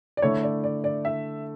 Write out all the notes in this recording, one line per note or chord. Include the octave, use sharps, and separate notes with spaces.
D5
D3 A3 E4 C#5
D5
D5
D5
E5